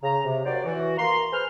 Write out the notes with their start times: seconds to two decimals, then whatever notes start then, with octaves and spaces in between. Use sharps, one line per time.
0.03 C#3 A#5
0.25 C3
0.45 D#2 F#3 C5 D5
0.65 E3 F#4
0.97 A#3 A#5 C6
1.33 G#4 B4 C5 C6 F6